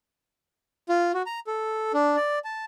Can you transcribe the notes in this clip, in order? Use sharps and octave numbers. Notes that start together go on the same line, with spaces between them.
F4
F#4
A#5
A4
D4
D5
A5